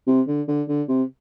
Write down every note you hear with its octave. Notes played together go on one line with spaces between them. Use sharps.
C3
D3
D3
D3
C3